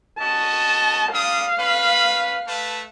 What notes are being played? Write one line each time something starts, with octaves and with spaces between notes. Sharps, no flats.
C#4 F#4 D#5 A5
G3 D4 F5 D#6
C#4 B4 B5
A3 B4 A5